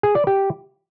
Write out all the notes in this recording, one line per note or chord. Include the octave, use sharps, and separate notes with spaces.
G#4
D5
G4